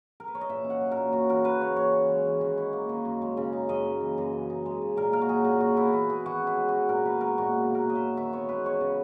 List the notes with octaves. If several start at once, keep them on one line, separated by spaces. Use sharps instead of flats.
A#4
B4
C#5
D#5
A#2 E5
C#4
F#5
F#3
A#4
A#2
F#2 F#4
E3 A#4
C#3 B4
A#3 C#5
E3 C#5
C#4
G#3
E3
D#3
E4
A#3
D#3
F#2
G#3
C#3
D#4
F#2 D#5
A#3
E3
F#2
C#3
D#4
G#3
C#3
A#2 A#4
A#3 A#4
F#4
F#3 G#4
A#2 G#4
C#3 F#4
B3 E4
F#4
E3 E4
E4 G#4
D#3 F#4
C#4
E4
G#3
D#3 F#4
A#2 A#4
B3 B4
G#3 A#4
A#2 F#4
B2
A#3
A#4
F#3 D#5
E5
D#4
D#3 E5
B3 C#5
G#3 B4
E4 C#5
C#3